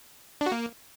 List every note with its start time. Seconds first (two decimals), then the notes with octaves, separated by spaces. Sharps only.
0.41 D4
0.46 F#4
0.52 A#3